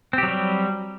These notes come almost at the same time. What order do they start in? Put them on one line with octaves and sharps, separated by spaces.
C4 G4 F#3 G3